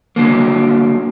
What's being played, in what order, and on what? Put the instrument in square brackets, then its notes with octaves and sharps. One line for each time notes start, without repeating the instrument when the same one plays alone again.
[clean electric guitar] D3 F#3 A#3